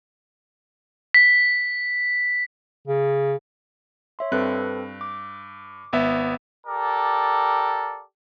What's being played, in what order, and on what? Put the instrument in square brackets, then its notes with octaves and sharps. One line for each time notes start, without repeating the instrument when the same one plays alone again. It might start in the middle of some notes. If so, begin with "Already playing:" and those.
[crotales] B6
[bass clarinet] C#3
[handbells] C#5 E5 C6
[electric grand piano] G2 F#6 [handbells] C4 A4 B4
[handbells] D6
[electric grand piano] G#1 B3 E5
[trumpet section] G4 A4 A#4 D5